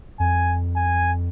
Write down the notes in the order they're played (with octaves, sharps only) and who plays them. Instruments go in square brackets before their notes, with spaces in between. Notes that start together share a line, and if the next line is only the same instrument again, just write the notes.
[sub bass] F2 [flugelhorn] G#5
[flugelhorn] G#5